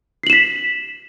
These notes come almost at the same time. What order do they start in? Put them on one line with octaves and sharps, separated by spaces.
C7 F#7 E7 B6